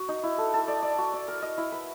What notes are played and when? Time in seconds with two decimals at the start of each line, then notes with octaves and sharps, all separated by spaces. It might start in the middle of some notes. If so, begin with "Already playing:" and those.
Already playing: F#4
0.09 D#4
0.23 E4
0.38 A4
0.54 A4
0.68 D5
0.82 D5
0.98 F#4
1.13 D5
1.28 A#4
1.42 D#5
1.58 E4
1.72 B4